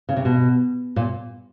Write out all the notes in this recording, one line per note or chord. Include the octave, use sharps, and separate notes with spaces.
C#3
C3
B2
A#2